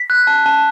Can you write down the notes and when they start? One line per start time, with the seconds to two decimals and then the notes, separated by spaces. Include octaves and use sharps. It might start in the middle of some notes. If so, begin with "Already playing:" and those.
Already playing: B6
0.10 F#6
0.27 A5
0.46 A5